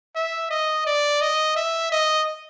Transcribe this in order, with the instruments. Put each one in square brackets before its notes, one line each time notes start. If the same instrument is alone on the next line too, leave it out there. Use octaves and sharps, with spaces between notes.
[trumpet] E5
D#5
D5
D#5
E5
D#5